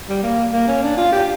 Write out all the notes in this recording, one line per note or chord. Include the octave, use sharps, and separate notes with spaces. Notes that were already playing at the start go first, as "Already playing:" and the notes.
G3
A#3
A#3
C#4
D4
F4
G4